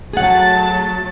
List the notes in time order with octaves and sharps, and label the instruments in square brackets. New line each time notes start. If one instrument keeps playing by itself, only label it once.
[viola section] F#3 [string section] A3 A5 A6 [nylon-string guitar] G#4 F#5